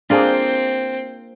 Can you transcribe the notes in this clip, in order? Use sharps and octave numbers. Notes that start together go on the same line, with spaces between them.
A#3 C4 D4 F4 G#4